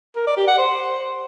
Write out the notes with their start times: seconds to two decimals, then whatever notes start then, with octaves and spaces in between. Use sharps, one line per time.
0.16 A#4
0.26 D5
0.37 G4
0.47 F#5
0.58 C5